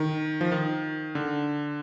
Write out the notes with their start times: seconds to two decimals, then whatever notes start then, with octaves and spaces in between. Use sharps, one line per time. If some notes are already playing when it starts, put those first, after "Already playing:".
Already playing: D#3
0.41 F3
0.52 D#3
1.15 D3